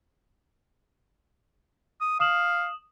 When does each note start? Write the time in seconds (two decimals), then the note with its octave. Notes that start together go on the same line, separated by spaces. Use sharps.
2.01 D#6
2.20 F5 D#6 E7 F#7